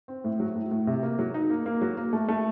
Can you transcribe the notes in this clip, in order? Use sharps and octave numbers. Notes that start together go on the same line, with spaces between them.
C4
A2
F#3
A2
A2
C3
A#3
F#3
D#4
A#3
A#3
F#3
A#3
A3
A3